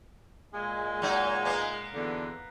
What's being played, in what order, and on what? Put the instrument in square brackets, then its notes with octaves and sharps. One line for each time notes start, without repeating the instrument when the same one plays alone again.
[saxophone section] A#2 G#3
[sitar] F#3 D#4
A#3 B3
[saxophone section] E2 B2 D3